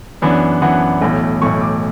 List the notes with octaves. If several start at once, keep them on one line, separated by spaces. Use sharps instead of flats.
F#2 E3 B3 D4
F#2 E3 B3 D4 F#5
B1 A2 E3
B1 A2 E3 C#6
D6